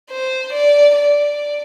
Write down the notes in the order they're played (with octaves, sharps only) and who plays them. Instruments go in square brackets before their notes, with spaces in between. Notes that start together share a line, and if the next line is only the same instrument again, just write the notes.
[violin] C5
D5
D5